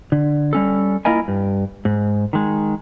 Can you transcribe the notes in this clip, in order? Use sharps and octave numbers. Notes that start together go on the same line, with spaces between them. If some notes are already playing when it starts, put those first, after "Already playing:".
D3
G3 C#4 A4
A#3 E4 F4 A#4 D#5 G#5
G2
G#2
D#3 G#3